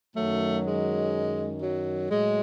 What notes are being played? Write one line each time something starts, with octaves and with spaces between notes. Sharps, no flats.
F#2 D#3 F#3 A3
G#3
F#3
A2 F#3 G#3